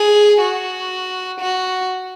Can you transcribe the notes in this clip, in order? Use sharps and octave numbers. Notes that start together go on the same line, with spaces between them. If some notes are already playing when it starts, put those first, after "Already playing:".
Already playing: G#4
F#4
F#4